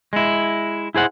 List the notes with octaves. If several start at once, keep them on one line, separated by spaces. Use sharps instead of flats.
G#3 E4
E4 G#4 C5 F#5